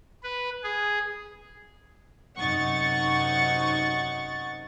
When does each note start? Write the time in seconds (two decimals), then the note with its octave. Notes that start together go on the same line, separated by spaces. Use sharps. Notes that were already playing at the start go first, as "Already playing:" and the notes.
0.23 B4
0.63 G#4
2.37 F#2 C3 D#4 F#5 C#6 A6